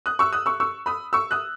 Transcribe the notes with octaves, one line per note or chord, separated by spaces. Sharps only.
D#6 F#6
C#6 E6
D#6 F#6
C#6 E6
C#6 E6
B5 D#6
C#6 E6
D#6 F#6